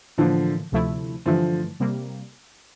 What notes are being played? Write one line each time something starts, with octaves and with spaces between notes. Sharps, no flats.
A2 D3 E3 F3 A#3
D2 C3 F3 A3 E4
G2 D3 E3 F3 A3
C3 G3 A#3